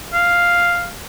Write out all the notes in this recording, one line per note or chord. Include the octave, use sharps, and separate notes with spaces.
F5